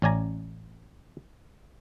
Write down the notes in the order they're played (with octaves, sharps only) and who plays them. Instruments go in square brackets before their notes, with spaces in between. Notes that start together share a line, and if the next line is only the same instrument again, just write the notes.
[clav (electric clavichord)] A1 C#4 D5 G#5 A#5